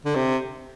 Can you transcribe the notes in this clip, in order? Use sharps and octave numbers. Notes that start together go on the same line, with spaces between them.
D3
C3